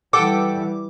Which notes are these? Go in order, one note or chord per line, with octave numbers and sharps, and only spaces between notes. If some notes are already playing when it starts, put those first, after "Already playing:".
E3 G3 A4 F#5 G5 D6